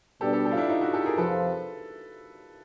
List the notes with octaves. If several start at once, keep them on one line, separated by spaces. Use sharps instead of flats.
B2 G3 B3 D4 G4 A4
G4 A4
G4 A4
F4
D4 E4
D#4 F4
E4 F#4
G4 A4
G#4 A#4
F2 C3 F3 A4 B4